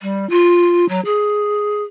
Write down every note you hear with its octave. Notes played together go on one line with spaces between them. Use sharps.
G3
F4
F#3
G#4